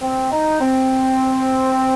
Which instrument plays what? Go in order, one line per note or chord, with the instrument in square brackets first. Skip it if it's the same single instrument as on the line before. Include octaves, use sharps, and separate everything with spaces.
[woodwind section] C4
D#4
C4